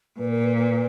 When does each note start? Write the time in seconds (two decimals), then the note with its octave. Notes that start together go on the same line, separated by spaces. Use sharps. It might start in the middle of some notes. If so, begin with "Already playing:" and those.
0.18 A#2 B4
0.31 A#4
0.44 B4
0.58 B4